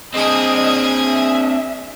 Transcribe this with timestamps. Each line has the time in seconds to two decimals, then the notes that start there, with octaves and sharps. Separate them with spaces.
0.14 C4 D4 G#4 D#5 G#5
1.06 E5